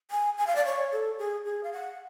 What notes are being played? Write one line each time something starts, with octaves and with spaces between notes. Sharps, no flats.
G#5
G#5
F5
D5
C#5
A4
G#4
G#4
F5
F#5